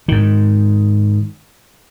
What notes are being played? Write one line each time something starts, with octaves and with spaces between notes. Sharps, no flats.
G#2 D#3